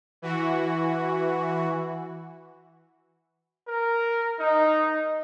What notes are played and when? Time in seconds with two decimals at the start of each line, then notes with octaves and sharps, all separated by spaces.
0.22 E3 F#4
3.68 A#4
4.39 D#4